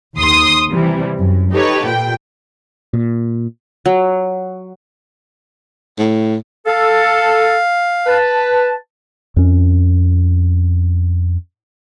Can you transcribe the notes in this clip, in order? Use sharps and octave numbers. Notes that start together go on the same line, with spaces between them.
D#2 C6 D#6
C3 E3 G3
F#2
D#4 G4 A4 B4 C#5
A#2 G5
A#2
F#3
A2
A4 F5
B4 A5
F2 C#4